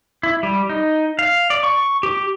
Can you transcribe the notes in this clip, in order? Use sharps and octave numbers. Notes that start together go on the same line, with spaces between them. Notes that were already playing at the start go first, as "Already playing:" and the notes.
E4
G3
D#4
F5
D5
C#6
G4